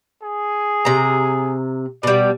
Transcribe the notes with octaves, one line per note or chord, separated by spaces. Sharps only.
G#4
C3 A#5
B2 G3 D5